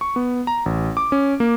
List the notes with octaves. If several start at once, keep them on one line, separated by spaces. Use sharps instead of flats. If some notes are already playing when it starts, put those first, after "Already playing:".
C#6
B3
A#5
A1
D6
C#4
A#3